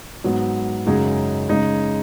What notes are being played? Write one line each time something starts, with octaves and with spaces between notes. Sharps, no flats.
G#2 F#3 B3
F#2 C#3 G#3 D#4 G#4
C#3 G#3 D#4 G#4